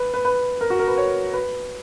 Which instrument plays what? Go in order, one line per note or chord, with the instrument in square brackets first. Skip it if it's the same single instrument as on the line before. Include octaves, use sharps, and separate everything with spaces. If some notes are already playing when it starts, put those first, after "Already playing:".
Already playing: [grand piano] B4
B4
B4
A#4
F#4
A#4
B4
C#5
B4